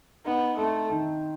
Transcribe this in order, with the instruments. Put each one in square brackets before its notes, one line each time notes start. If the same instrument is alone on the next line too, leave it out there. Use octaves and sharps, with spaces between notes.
[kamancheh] B3 [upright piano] D#4
[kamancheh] A3 [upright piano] C4
[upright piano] D#3